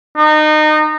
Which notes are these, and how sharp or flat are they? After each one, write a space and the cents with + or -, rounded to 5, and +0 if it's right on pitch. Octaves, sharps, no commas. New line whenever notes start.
D#4 -25